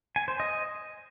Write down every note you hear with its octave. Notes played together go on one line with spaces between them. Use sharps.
G#5
C5
D#5